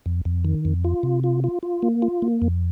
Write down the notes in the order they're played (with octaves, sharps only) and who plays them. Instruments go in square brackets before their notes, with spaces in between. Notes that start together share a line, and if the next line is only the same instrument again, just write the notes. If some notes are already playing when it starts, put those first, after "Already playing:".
[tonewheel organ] F2
F2
D#3
F2
F4
C3
F4
F4
F4
A#3
F4
A#3
F2